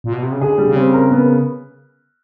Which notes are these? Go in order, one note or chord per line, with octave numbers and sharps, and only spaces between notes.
A#2
B2
C3
C#3
D3 G#4
G3
C#3
C4
A#4
B3